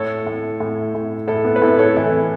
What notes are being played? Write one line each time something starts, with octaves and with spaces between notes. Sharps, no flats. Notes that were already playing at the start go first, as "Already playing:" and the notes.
Already playing: A2 A4 C#5
A2
A2
A2
A2 E4 A4
B3
B4
A2 E4 A4
A4 C#5
E3 E4 A4